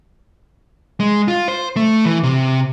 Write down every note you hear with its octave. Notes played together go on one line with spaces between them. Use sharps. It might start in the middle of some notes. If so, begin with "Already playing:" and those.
G#3
F4
C5
A3
E3
C3